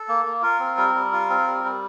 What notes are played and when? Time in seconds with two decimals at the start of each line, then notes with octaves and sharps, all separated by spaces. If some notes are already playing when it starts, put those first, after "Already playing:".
Already playing: A4
0.08 A#3
0.25 A#3
0.42 F4 A#4
0.60 C4
0.77 G3
0.95 G3
1.12 F4
1.30 C4
1.47 G3
1.65 G3